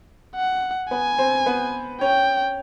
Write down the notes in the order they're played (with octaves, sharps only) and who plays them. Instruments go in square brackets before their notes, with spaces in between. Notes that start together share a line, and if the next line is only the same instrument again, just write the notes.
[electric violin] F#5
[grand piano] B3 B4 [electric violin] G#5
[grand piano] C4 C5
B3 B4
[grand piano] C#4 C#5 [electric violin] G5